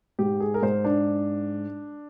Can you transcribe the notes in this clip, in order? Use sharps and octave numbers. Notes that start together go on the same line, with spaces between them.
G#2 G4
G#4
A#4
G#2 C5
D4